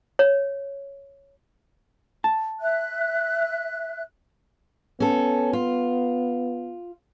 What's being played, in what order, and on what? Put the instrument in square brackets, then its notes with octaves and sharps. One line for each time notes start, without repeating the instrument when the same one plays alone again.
[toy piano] C#5
[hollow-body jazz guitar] A5
[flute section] E5 F#6
[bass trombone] B3 [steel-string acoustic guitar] C#4 A4
[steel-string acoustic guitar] F4